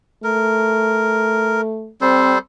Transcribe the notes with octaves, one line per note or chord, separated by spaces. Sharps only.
A3 A#4
G3 C4 A4 C5